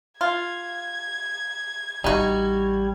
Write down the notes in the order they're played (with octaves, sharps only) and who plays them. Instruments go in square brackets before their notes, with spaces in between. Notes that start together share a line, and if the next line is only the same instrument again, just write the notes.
[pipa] F4 [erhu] G#6
[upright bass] A1 [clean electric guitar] G3 [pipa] D#4 F#4